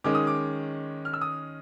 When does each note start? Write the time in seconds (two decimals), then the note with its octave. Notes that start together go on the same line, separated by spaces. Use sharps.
0.04 D#3 G#3 C#4 D6
0.15 D#6
0.27 D6
1.05 F6
1.14 E6
1.21 D#6